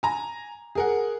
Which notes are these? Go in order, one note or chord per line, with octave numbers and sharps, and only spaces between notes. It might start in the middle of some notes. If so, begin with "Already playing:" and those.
G#5 A#5
G#4 A#4 F#5